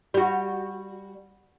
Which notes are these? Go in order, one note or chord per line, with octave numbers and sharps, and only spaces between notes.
G3 F#4